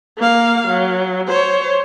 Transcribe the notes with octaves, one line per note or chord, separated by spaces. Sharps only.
A#3 F5
F#3
C5 C#5